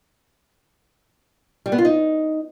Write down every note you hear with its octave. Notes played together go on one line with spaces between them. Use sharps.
G3
B3
F4
D#4